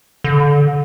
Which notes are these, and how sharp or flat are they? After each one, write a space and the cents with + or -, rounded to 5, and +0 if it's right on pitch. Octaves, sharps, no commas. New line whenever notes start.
D3 -20